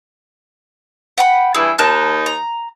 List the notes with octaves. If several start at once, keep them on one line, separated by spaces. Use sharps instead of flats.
F#5 G5 B5
G2 E3 E4 G#4
D#2 D#4 A5 F6 F#6
A#5